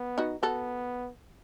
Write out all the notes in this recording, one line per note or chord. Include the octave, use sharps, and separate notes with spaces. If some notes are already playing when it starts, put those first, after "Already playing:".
Already playing: B3
D#4 F#4
B3 F#4 A4